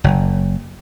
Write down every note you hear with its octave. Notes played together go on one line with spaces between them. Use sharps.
F#1